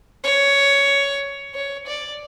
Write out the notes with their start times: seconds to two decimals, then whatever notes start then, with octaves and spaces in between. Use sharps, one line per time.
0.24 C#5
1.54 C#5
1.87 D5